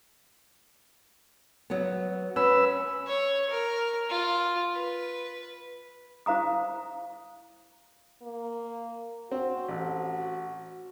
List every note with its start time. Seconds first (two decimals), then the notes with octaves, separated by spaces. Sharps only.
1.70 F#3 B3
2.36 C#4 B4 E6
3.07 C#5
3.50 A#4
4.10 F4
4.74 B4
6.26 E4 C5 F5 A#5 D#6
8.22 A#3
9.31 C4 F#4
9.69 A1